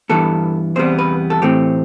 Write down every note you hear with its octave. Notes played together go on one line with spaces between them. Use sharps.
G2 E3 G3 B3 A4
E2 C3 G3 B3 C5
B4
A4
A2 E3 A3 C4 G4